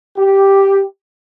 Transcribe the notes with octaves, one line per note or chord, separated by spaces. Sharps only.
G4